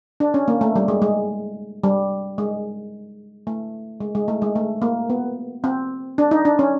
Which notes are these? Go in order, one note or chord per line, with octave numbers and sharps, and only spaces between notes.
D4
C#4
A#3
A3
G3
G#3
G#3
G3
G#3
A3
G#3
G#3
A3
G#3
A3
A#3
B3
C4
D4
D#4
D4
C#4